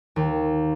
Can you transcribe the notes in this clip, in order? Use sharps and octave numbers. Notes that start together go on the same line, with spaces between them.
D#2